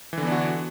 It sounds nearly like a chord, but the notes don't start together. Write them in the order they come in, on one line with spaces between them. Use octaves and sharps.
E3 D3 B3 D4 F#4